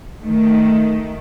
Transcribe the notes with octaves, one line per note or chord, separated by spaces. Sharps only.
D#3 A3